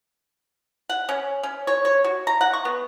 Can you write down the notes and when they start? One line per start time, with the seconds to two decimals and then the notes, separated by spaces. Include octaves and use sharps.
0.89 F#5
1.09 C#4
1.43 C#4
1.67 C#5
1.85 C#5
2.04 F#4
2.27 A#5
2.41 F#5
2.53 C#6
2.65 B3